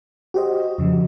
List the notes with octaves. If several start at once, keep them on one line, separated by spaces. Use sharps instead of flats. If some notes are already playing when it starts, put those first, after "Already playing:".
F#4 G4 C5 D#5
F2 C#3 F3